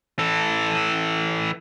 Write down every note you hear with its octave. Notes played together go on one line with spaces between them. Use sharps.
E3 A4